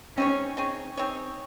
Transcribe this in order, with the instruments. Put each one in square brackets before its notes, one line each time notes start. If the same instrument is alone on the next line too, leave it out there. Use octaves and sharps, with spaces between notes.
[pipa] C4 D#4 G#4 C#5 [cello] C#4
[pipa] C4 D#4 G#4 C#5
C4 D#4 G#4 C#5